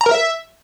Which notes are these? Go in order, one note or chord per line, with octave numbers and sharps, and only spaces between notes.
A#5
A#4
E5